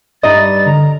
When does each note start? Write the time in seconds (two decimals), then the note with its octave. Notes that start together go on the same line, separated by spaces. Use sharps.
0.23 G2 G3 D#4 D#5 A6
0.66 D3 A#5